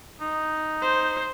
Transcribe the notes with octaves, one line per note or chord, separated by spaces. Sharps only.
D#4
C5